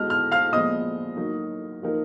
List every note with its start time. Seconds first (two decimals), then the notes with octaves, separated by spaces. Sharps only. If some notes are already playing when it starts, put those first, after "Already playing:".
Already playing: G#3 B3 F#4 D#5 F6
0.10 F6
0.32 F5 F6
0.53 A#2 F3 G#3 B3 D#5 D#6
1.17 F#3 A#3 D#4
1.82 F3 A#3 D#4 A#4